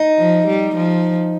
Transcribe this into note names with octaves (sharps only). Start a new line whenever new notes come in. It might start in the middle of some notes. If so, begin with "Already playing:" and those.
Already playing: D#4
F3
G3
F3